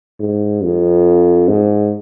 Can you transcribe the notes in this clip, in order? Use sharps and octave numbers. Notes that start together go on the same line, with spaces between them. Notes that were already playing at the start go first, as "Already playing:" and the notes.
G#2
F2
G#2